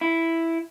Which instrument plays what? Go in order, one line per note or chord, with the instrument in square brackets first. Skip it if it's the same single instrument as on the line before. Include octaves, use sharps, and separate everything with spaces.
[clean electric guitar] E4